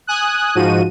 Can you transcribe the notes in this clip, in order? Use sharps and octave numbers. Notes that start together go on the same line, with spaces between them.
G#5 D#6 F#6
G#2 F3 F#4 D#7